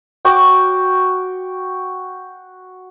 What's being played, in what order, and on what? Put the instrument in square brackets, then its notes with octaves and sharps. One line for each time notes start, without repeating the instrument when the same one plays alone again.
[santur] F#4 G5 C#6 D6